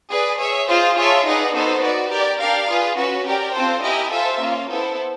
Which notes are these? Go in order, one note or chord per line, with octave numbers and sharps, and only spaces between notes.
G#4 B4 D5
G#4 C#5 E5
F4 G#4 C5 D#5
F4 G#4 C#5 E5 A5
D#4 G#4 B4 D5 F#5
B3 D#4 F#4 A4 C5
F#4 B4 D5
G4 A#4 D5
D4 G4 A#4 D5 F5
F4 G#4 B4
C#4 F#4 B4
G4 A#4 D5 G5
C4 F4 A4 C5
E4 G4 A#4 D#5 G#5
F4 A4 C5 E5
A#3 C#4 F4
B3 E4 A4 C5